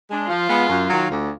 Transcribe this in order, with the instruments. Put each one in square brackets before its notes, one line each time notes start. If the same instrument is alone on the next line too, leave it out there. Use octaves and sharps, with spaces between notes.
[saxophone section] G#3 D4
[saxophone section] F3 [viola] F4
[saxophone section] G#3 B3
F#2
D#3 F#3
D2